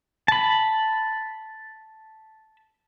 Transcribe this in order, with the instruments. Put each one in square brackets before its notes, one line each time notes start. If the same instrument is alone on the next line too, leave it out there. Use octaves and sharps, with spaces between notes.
[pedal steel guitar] A5 B5